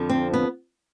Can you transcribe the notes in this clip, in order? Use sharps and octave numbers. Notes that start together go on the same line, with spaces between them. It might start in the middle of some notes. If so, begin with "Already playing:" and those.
Already playing: F2 D3 F3
C4
B3